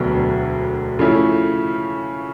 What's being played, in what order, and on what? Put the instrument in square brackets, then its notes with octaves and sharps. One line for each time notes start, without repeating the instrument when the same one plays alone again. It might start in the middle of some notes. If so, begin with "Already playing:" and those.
Already playing: [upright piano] E1 D2 D3 F#3 B3
C#3 F3 A3 C#4 E4